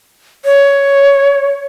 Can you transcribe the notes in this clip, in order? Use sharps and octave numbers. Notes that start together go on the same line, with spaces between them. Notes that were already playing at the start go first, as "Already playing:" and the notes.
C#5